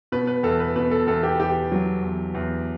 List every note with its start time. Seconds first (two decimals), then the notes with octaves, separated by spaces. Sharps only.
0.12 B2 B4
0.27 B4
0.43 E2 A4
0.60 B4
0.76 B2 B4
0.91 A4
1.07 E2 A4
1.23 G4
1.40 E2 G4
1.72 F#3
2.02 E2
2.34 E2